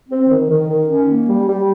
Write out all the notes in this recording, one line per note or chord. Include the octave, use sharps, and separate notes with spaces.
C4
D#3
D#3
D#3
C#4
A#3
G3
G3